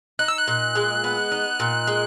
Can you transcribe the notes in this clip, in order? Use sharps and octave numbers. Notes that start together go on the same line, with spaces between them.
D#4 F#6
E6
F#6
A#2
G#3
B3
D#4
A#2
G#3